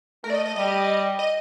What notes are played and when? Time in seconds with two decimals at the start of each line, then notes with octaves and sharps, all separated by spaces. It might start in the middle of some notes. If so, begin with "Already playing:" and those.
0.24 A3 A#4
0.30 D5
0.35 D#5
0.46 D#5
0.56 G3 D#5
1.19 D#5